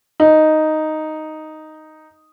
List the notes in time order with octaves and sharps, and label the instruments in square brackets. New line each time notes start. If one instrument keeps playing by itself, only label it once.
[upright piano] D#4